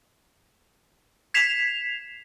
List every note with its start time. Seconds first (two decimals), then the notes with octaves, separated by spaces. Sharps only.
1.34 G#6 B6 C7 E7 F7